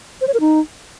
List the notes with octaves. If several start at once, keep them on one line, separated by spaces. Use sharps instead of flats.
C5
C#5
A#4
D#4